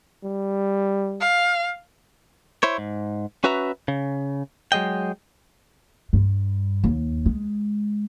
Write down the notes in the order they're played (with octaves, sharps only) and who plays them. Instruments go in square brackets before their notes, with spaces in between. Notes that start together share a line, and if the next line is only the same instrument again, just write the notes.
[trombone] G3
[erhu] F5
[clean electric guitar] E4 C5 C#5
G#2
C#4 F#4 B4 E5 A#5
C#3
F#3 G#3 D#5 G5
[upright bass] G2
D#2
G#3